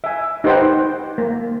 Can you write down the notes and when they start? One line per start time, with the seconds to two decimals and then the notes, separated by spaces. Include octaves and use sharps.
0.04 E5 G#5
0.44 D#4 G4 B4 C5 F#5 G5
1.18 A#3